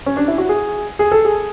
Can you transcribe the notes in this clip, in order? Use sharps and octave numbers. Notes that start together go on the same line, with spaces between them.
C#4
D4
E4
F#4
G#4
G#4
A4
G#4